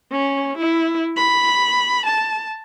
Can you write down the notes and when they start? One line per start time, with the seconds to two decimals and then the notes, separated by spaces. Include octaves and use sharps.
0.11 C#4
0.57 E4
1.17 B5
2.06 A5